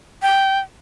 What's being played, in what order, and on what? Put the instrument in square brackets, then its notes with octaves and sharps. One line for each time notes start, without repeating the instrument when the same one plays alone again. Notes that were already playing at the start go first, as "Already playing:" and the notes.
[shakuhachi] G5